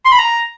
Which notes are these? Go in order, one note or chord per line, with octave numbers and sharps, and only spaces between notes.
C6
B5
A#5